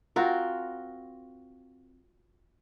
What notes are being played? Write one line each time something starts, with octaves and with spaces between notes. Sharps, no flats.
C4 F4 F#4 A#4